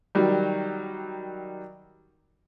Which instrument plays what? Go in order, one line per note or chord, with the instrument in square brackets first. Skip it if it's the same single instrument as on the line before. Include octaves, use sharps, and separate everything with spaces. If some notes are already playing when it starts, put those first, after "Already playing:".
[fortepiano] D#3 F#3 G3